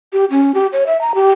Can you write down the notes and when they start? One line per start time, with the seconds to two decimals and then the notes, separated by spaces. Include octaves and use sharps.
0.13 G4
0.31 C#4
0.55 G4
0.73 C#5
0.86 E5
1.01 A#5
1.15 G4